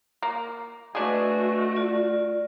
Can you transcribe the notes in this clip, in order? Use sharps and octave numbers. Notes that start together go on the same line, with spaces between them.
A#3
A3 D4 F#4 G#4 B4 D#5
F4 D5